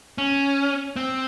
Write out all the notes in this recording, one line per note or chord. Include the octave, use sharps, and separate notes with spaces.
C#4
C4